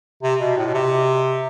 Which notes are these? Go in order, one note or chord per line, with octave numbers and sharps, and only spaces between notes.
C3
B2
A2
B2
C3